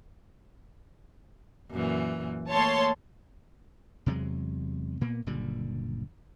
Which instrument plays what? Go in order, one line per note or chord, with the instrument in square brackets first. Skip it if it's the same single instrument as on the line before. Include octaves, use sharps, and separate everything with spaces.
[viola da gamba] F#2 A#2 E3
[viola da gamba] A3 A#3 [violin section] C#5 A5 C6
[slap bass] E2 C3 F#3 G#3
A#2 A#3 B3
F#1 A#2 D3 G3